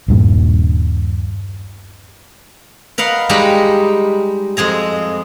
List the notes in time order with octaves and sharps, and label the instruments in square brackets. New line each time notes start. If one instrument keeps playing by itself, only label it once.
[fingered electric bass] D#1 G2 A#2
[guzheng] A#4 B4 D#5 F5 F#5
G3 G#3 D#4 G4 A#5 B5
F2 G#3 G#4 A#5